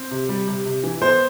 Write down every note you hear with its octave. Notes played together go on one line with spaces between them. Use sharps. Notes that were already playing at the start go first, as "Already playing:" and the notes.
Already playing: C4
C3
G3
C3
C3
E3
B3 C5